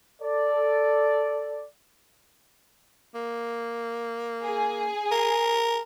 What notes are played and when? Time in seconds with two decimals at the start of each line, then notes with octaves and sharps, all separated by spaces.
0.22 A4 D5
3.15 A#3
4.42 G#4
5.12 A#4